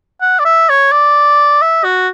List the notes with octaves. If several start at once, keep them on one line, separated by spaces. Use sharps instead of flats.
F#5
D5
E5
C#5
D5
E5
F#4